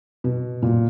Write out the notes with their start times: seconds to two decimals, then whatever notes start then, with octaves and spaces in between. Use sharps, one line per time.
0.24 B2
0.62 A#2